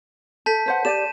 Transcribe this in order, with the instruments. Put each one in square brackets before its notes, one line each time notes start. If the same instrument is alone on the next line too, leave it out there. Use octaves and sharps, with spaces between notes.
[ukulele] A4 [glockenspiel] A5 G6 B6
[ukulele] B4 C5 F#5
[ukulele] G4 D5 [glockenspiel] D#7 E7